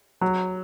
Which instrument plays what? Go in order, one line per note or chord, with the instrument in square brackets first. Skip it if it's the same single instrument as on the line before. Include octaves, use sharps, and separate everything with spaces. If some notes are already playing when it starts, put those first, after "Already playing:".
[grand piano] F#3